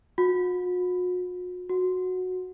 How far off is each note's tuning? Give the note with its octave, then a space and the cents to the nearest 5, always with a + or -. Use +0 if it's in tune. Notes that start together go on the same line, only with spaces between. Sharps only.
F#4 -45
F#4 -10